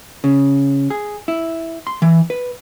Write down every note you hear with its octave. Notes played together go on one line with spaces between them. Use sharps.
C#3
G#4
E4
C6
E3
B4